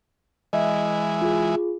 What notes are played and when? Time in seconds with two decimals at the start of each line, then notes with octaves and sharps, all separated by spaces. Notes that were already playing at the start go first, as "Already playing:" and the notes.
0.53 E3 G#3 D#5 E5
1.22 F4 G#4